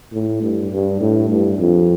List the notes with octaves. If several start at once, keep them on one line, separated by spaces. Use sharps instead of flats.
A2
G2
G2
A2
G2
F2